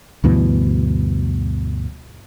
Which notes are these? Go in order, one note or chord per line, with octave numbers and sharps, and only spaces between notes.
D2 G2 B2 E3